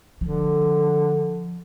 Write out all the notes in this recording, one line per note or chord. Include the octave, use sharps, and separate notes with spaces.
D3 F3